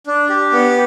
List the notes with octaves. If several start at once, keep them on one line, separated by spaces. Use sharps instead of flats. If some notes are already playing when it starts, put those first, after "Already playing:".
D4
G4
B3